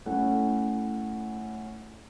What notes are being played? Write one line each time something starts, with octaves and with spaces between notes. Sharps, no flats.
A3 C#4 E4 F#5